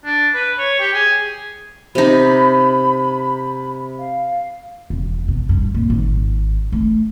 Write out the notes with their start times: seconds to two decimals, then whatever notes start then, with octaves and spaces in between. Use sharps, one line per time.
0.05 D4
0.34 B4
0.59 C#5
0.79 G4
0.94 G#4
1.95 C3 D#4 B5
3.98 F5
4.90 E1
5.28 B2
5.49 G2
5.74 A#2
5.90 G#1
6.72 A3